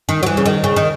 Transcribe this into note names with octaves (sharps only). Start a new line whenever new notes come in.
D#3
F#3
E3
C#3
D#3
C#3
D#3